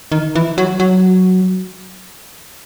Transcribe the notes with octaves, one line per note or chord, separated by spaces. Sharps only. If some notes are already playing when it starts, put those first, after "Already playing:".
D#3
E3
F#3
F#3